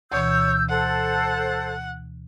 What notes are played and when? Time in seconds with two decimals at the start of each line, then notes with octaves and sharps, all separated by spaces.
0.12 D2 B2 E3 C#5 E6 G6
0.69 A4 C5 F#5